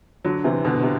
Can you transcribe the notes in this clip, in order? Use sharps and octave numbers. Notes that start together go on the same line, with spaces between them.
D3 F#3
C3 E3
B2 D3
C3